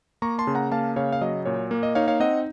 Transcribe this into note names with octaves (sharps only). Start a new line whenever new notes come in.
A#3 A#5 C#6
A5 C6
C#3
F#5 A#5
A#3 F5 A5
C#3 C#5 F5
F5
F#3 D#5
A#2 C#5
A#3
D#5
D#4 C#5 F5
C#5 F5
C4 D#5 F#5